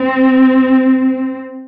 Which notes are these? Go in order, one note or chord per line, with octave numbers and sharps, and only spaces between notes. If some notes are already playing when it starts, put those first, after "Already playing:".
Already playing: C4